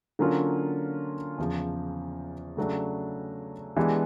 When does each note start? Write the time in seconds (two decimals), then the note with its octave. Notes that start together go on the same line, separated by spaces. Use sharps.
0.19 D3 F#3 A#3 C#4 F4
1.38 E2 C#3 F3
2.57 C#3 F#3 A3 D4
3.77 E3 G#3 B3 D4 G4